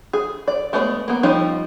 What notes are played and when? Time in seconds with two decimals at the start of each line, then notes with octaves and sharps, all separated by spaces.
0.13 G#4
0.48 D5
0.73 G#3 A3 B3 C5 D5
1.08 A#3 B3
1.23 F3 G3 C4 C#4 D#4